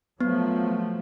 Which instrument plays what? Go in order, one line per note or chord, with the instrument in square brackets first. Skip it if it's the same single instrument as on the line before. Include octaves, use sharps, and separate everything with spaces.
[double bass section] F3 F#3 A3 [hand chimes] B3